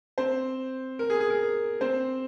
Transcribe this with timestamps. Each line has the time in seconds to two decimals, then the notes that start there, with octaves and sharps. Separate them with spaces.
0.18 C4 C5
0.99 A#4
1.10 G#4
1.20 G#4
1.30 A#4
1.81 C4 C5